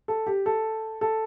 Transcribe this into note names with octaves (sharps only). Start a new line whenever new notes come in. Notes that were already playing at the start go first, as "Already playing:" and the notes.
A4
G4
A4
A4